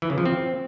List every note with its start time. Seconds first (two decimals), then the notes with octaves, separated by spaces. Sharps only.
0.02 E3
0.10 C#3
0.18 F3
0.26 C4